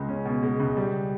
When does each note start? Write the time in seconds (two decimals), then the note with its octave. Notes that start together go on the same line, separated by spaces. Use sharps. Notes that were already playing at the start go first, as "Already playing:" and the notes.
Already playing: C#2 G#3
0.09 C#4
0.25 B2
0.43 G#3
0.60 C#2
0.77 G3